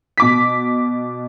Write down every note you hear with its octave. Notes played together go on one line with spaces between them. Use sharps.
B2 D6 B6